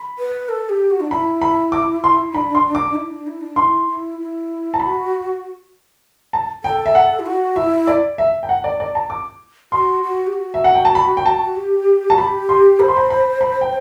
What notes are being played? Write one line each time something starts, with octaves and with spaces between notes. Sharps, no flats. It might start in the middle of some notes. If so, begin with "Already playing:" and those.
Already playing: B5
B4
A4
G4
F#4
D4
E4 B5
B5
D6
C6
D4 B5
C6
D6
E4
D4
E4
D4
E4 C6
E4
E4
A5
F#4 B5
A5
A4 G5
E5
F#5
E4
F#4
E4 E5
D5
E5
G5
F#5
D5
D5
A5
D6
F#4 C6
F#4
G4
F#4
E5
F#5
G5
A5
B5
G5
A5
G4
F#4 A5
G4 B5
C6
C5 B5
C6
B5
B5
B5
G5